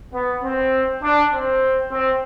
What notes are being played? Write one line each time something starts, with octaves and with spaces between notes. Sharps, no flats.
B3
C4
D4
C4
C4